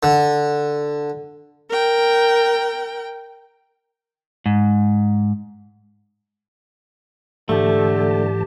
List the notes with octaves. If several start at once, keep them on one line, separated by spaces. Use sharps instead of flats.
D3
A#4 G5
G#2
G#2 D3 E3 A3 G4 A5